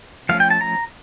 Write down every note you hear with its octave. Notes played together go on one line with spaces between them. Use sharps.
F3 A3 C#4 F5
G5
A5
A#5